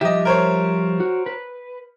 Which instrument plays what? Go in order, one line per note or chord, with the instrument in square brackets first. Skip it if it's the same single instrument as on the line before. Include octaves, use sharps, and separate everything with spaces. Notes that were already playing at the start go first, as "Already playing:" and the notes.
[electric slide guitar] F3 G3 E5 [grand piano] G4 D#5
[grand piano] A#4 C5 C#5
[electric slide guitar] F#4
B4